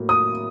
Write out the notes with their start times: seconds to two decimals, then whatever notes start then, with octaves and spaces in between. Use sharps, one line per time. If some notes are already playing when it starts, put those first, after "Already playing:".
Already playing: A2 F#3 A#3
0.09 D#6